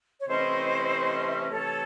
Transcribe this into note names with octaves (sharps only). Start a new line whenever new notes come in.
C#5
C3 E3 A3 C#4 E4 C5 D#5
E5
D#5
C3 E3 A3 A4 C#5